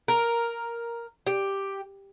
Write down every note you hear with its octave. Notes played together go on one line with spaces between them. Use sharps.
A#4
G4